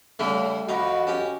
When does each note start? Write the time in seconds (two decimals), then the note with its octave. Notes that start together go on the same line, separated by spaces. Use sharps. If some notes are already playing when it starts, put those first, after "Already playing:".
0.19 C#3 G3 A3
0.68 F2 D#4 F#4 A#5
1.07 C#4 G4